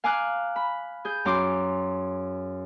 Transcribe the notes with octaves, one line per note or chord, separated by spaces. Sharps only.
F5 G#5 A#5 D6 F6 F#6
B5
G#4 G6
F#2 A#5 C6 D6